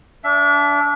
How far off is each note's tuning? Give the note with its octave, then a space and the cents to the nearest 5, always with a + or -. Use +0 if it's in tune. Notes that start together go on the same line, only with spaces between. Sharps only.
D4 -25 E5 +20